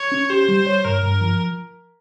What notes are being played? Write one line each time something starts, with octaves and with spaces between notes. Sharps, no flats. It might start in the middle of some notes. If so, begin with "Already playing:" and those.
Already playing: C#5
C#4
G4 C5
G3
C#5
G2 A#4
G2
F3